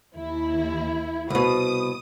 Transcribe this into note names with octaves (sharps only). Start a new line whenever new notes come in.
D#2 E4
C2 B2 D#6